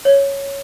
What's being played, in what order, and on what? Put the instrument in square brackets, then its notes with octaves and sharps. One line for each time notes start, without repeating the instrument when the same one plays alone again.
[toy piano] C#5